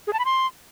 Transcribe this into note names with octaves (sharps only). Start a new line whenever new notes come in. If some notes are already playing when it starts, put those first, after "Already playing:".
G#4
A5
B5
C6